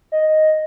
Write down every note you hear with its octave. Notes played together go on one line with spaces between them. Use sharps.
D#5